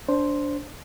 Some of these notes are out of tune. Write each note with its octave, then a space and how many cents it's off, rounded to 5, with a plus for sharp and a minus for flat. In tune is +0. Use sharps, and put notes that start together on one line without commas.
D4 -15 C5 +0